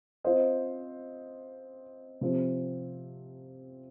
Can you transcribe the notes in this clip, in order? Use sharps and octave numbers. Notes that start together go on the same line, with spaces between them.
C4 F4 C5 D#5
C3 F3 C4